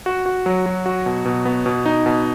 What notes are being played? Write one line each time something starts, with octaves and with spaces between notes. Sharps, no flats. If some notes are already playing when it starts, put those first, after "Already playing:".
F#4
F#4
F#3
F#3
F#4
B2
B2
B3
B2
D#4
B2